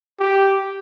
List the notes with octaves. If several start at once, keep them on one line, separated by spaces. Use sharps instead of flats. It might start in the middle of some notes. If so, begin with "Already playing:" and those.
G4